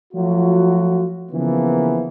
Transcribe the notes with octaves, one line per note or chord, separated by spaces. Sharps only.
F3 F#3 A3 F4 F#4
C#3 E3 F3 A#3 B3